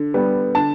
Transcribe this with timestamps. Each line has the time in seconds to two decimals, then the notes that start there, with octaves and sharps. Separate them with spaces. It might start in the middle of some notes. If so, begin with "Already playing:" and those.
Already playing: D3
0.14 G3 B3
0.55 D3 A5